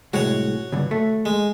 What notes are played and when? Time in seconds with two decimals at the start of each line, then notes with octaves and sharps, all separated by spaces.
0.13 C2 A2 G#3 F#4 C#5
0.72 C#2 G2 D3
0.91 A3
1.26 G#3